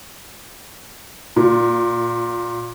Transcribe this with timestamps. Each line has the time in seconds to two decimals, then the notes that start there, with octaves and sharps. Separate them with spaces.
1.36 A#2